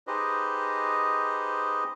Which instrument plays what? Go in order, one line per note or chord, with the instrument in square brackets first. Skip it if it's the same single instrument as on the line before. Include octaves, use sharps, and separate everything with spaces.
[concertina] D#4 G4 G#4 B4 C5 D#5